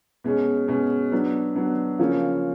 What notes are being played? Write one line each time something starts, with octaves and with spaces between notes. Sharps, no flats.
B2 G#3 C#4
B2 G#3 C#4
F#3 B3 D4
F#3 B3 D4
C#3 F3 A#3 C#4